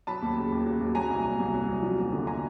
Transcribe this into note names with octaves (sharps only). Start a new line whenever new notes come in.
F#3 A5 B5
D#2
C#3
D#2
F#3
D#2
F#3 G#5 A#5
C2
A#2
C2
F#3
C2
F3
D#2
D3
G#5 A#5